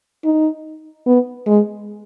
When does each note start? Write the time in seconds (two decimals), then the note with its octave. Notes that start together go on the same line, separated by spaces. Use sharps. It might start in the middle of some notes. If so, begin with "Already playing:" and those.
0.24 D#4
1.06 B3
1.47 G#3